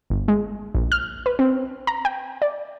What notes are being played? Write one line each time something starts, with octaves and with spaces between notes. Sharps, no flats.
G1
G#3
A#1
F6
B4
C4
A#5
G5
D5